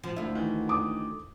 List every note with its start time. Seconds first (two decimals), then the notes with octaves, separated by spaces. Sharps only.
0.03 F3
0.16 D2 E4 F4
0.35 D#3 E3
0.69 D6 D#6